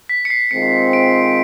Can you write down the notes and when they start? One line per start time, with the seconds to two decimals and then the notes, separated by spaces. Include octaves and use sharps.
0.09 B6
0.25 C#7
0.30 C7
0.51 D#3 G#3 C4 F4 C#7
0.93 D7